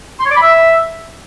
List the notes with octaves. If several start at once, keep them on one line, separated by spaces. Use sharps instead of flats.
C6
C#5
D5
B5
E5